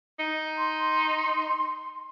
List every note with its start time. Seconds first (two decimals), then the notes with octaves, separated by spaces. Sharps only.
0.19 D#4
0.57 C6